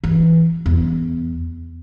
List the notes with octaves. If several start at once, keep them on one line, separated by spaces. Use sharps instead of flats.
E3
E2